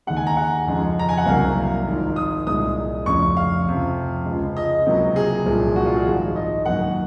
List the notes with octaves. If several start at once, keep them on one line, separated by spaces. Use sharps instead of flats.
D#2 D#3 G#3 F#5
G#5
A#5
F#5
F2 C#3 F3 G#3
A#5
G#5
F#5
C2 C3 F#3 A#3 F5
G#1 G#2 F3
D#6
C2 A#2 G#3 D#6
F1 F2 C#3 C#6
F5
F2 C3 F3
C#2 C#3 F3 G#3
D#5
C#2 C3 F#3 A#3
G#4
C2 A#2 F3
F#4
F4
G#4
G#1 G#2 F3
D#5
F#2 D#3 A#3 F#5